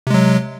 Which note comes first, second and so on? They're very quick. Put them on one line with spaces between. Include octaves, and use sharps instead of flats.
C3 G#3 F#3